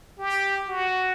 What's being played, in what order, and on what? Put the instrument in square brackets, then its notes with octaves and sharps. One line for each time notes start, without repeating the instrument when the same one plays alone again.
[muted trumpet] G4
F#4